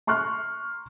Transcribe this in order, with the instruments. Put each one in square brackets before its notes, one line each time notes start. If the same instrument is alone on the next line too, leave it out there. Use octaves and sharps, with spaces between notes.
[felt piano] A#5 C6 C#6 F6 F#6